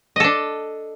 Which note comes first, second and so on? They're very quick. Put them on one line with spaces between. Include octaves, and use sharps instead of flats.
D#5 A4 D4